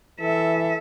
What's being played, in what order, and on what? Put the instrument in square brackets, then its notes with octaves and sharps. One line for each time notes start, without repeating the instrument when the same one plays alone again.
[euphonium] E3 [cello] A4 E5